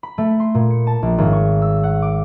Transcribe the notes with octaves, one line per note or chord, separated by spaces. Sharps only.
B5
A3
C6
A#2
C#7
A5
A#1
G#1
C#6
E6
F#5
D6